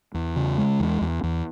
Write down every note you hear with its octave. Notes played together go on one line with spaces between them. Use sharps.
E2
C#3
G#3
E2
E2
E2